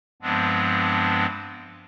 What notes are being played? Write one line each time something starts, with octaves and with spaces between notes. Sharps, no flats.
G2 F3 G#3 B3 C4 D4